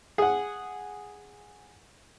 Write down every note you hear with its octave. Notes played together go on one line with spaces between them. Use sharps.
G#4 F#5